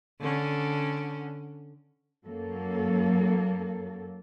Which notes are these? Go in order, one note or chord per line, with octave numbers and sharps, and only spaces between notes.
D3 C#4
F#2 F#3 A#3 A4